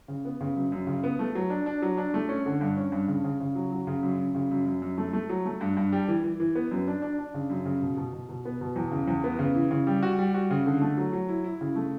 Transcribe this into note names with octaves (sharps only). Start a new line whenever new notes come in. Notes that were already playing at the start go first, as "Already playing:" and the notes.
C#3
B3
C#3
F#2
F#2
C#3
B3
A3
F#3
D4
D4
F#3
D4
A3
C#4
D3
G2
C#4
G2
C#3
C#3
C#3
F#3
F#3
C#3
F#2
F#2
C#3
F#2
F#2
F#2
A3
A3
F#3
A3
G2
G2
G3
E3
E3
E3
B3
F#2
D4
D4
D4
C#3
F#2
C#3
B2
B2
B2
B2
B3
B2
E2
C#3
E2
B3
C#3
E3
C#3
G3
F#4
G3
F#4
C#3
D3
A3
F#3
F#3
E4
E4
C#3
A3